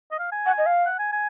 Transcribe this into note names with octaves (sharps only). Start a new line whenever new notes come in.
D#5
F5
G#5
F#5
D#5
F5
F#5
G#5
G#5